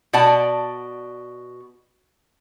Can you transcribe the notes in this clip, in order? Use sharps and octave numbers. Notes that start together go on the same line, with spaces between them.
B2 D5 F#5 A5